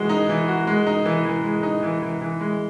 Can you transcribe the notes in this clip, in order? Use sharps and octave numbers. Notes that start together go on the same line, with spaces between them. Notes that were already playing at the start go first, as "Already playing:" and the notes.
Already playing: E3 G#3 F#4
D#4
E3
F#4
G#3
D#4
E3
E3
G#3
D#4
E3
E3
E3
G#3